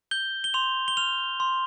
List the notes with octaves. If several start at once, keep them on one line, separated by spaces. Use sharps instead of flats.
G6 G7
G7
C6 F7
G7
F6 F7
C6